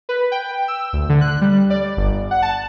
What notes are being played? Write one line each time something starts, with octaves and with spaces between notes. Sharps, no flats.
B4
G5
E6
D2
D3
F#6
G3
D5
G1
F#5
A5